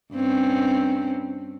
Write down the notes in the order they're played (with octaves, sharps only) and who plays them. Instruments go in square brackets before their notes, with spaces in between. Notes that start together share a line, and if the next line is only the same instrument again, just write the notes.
[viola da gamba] G2 C4 C#4